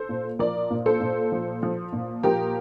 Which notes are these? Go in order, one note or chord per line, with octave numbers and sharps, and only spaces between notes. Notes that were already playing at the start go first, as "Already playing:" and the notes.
Already playing: A4 C5
A#2
F3 A#4 D5
A#2
A4 C5
A#2
F3
F3
A#2
F3 G4 A#4